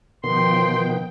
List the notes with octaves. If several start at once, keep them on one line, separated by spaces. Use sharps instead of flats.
B2 D#3 F3 B3 G5 C6